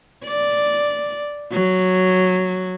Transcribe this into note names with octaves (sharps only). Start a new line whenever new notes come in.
D5
F#3